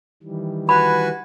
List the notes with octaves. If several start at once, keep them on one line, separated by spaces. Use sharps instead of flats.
D#3 E3 G3
F#4 B4 G#5 B5